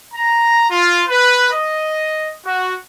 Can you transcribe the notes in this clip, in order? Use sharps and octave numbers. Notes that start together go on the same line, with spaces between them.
A#5
F4
B4
D#5
F#4